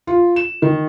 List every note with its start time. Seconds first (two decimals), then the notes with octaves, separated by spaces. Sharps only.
0.07 F4
0.36 E7
0.62 D#3